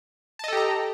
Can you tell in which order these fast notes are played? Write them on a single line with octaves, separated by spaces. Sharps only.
A5 D#5 A4 G4 A#5